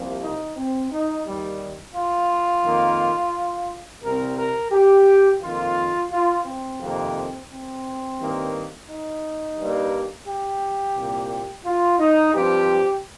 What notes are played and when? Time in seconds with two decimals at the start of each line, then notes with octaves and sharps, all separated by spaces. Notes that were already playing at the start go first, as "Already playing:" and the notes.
Already playing: C2 C3 F3 A#3
0.23 D#4
0.57 C4
0.91 D#4
1.26 D#2 D#3 G3
1.95 F4
2.65 F2 D#3 A#3
4.03 C2 C3 G3 C4 A#4
4.39 A#4
4.72 G4
5.42 F2 D#3 A#3 F4
6.11 F4
6.45 C4
6.80 F2 C3 D#3 A#3
7.50 C4
8.18 G2 D#3 A#3
8.88 D#4
9.58 G2 G3 A#3
10.27 G4
10.95 C2 A#2 A#3
11.65 F4
11.99 D#4
12.34 G2 F3 C4 G4